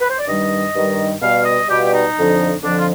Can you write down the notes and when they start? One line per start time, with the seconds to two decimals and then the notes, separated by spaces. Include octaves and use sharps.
0.01 B4
0.09 C5
0.19 D5
0.28 G2 D#3 G3 D#5
0.75 G2 D#3 G3
1.21 B2 G3 F5
1.45 D#5
1.68 B2 G3 G4
1.80 F4
1.92 D#4
2.15 F2 D3 F3
2.62 F2 D3 F3 D4
2.79 F4